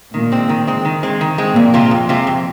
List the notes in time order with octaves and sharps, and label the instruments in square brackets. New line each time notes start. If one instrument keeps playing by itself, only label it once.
[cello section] A#2 A#3 [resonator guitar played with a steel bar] D#3
[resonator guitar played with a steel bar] G#3 C4
D#3
G#3 C4
D#3
G#3 C4
D#3
G#3 C4
[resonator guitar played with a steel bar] F2 [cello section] A#2 A#3
[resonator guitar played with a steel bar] C3 G#3 C4 F4
F2
C3 G#3 C4 F4
F2